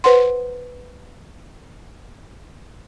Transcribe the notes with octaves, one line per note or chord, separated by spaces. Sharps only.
B4 C5 F#5 C6